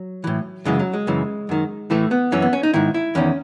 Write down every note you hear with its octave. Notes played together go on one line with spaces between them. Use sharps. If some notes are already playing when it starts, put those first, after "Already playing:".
Already playing: F#3
A2 E3
F#2 C#3 E3 G#3
F#3
G#3
F#2 C#3 E3
F#2 D#3
A2 E3 A3
B3
F#2 E3 C#4
B3
C#4
D#4
G#2 D#3 E4
E4
E2 D#3 C#4